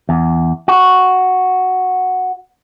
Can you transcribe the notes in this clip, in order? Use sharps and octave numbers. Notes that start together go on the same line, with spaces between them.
E2
F#4